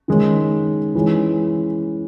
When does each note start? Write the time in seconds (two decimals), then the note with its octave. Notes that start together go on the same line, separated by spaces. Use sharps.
0.08 D#3 G#3 C#4
0.95 E3 G#3 C#4